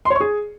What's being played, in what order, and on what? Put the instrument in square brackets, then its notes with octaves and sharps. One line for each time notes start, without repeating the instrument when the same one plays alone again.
[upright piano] C6
C#5
C#6
G#4